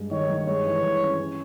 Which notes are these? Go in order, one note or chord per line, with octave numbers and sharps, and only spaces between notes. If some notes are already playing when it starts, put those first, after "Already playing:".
Already playing: G2 G#3
D#3 C#5
G2
G#3 C#5
E3
G2
C#4
C#4